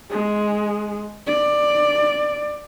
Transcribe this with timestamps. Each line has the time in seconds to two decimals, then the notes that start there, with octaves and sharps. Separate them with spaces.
0.10 G#3
1.27 D5